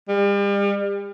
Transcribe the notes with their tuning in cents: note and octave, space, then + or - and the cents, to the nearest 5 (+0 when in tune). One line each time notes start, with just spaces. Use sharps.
G3 +40